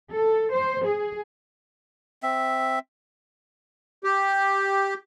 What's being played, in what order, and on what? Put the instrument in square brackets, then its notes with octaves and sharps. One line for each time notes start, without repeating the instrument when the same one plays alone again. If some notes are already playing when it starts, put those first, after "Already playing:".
[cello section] A4
C5
G#4
[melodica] C4 E5
[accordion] G4